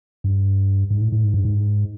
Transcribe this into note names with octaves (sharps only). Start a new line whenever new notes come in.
G2
G#2
A2
A2
G#2
G2
G#2